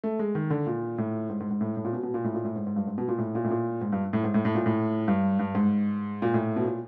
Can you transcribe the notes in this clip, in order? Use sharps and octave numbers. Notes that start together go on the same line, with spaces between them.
A3
G#3
D#3
D3
A#2
A2
G#2
G#2
G#2
A2
A2
A#2
B2
B2
A#2
A2
A#2
A2
G#2
G#2
G2
G#2
B2
A#2
A2
A#2
A2
A#2
G#2
G2
A2
G#2
A2
A2
A#2
A2
G2
G2
G#2
A#2
A2
B2
A#2